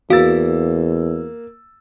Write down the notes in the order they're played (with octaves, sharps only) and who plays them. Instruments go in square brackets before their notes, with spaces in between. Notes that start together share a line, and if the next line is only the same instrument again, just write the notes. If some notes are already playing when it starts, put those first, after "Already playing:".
[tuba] E2 [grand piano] A#3 E6 A6 [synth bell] F#4 F5